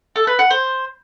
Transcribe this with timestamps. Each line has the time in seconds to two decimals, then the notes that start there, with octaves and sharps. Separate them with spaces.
0.16 A4
0.27 B4
0.39 F#5
0.51 C5